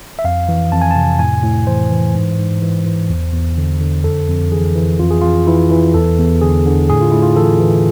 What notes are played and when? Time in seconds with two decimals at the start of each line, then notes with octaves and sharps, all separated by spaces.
0.19 E5
0.24 F2 F5
0.49 E3
0.72 F2 A5
0.82 G#5
0.91 A5
0.96 C3
1.19 A2 G#5
1.43 A2
1.67 E3 C5
1.91 E3
2.15 G#2
2.38 G#2
2.62 E3
2.86 E3
3.10 E2
3.33 E2
3.58 D3
3.81 D3
4.04 F2 A4
4.28 F2
4.52 E3 G#4
4.75 E3
4.99 F2 F4
5.11 G#4
5.22 F2 F4
5.47 E3 E4
5.71 E3
5.94 E2 A4
6.19 E2
6.41 D3 G#4
6.66 D3
6.89 A2 G#4
7.01 F4
7.12 A2 E4
7.22 F4
7.36 E3 A4
7.60 E3